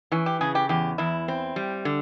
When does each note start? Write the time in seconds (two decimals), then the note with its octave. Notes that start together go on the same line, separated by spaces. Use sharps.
0.12 E3 C#4
0.26 G4
0.41 C#3 G#4
0.55 G4
0.69 E2 G4
0.98 E2 E4
1.28 C4
1.56 G3
1.85 D3